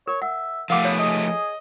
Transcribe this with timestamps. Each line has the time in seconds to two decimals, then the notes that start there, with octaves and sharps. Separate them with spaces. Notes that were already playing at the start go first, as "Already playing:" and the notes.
0.08 A#4 C#5
0.22 E5 F#5
0.70 F3 A3 A#4 F5 F#5 D6
0.85 B3 C#5
0.99 G#4 D#5